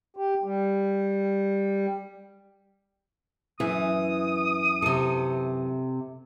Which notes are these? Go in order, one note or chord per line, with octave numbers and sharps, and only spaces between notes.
G4
G3
F#2 E3 D#6
C3 A4